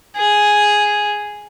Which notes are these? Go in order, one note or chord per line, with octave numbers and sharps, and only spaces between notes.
G#4